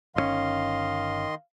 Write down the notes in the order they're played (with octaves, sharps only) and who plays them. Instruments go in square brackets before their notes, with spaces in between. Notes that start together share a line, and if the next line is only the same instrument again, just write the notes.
[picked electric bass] G1 D3 C#4 [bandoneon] D#3 D#5 C6 [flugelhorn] F5